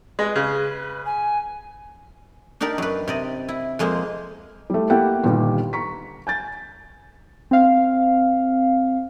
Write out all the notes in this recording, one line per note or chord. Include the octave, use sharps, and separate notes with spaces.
G#3 B4
C#3
G#5
D4 D#4 G4 A#4 D5
F#2 B4
C3 D5 D#5
E4
F2 G#3 A#3 C5
G3 A3
A#3 E4 G4 A4 F#5 G5
G1 A#2 D#3 G3
A#5 C#6 B6
G#5 G6 A6
C4 F5